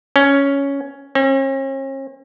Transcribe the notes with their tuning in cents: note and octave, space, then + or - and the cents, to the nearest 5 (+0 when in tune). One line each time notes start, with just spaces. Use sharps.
C#4 +5
C#4 -45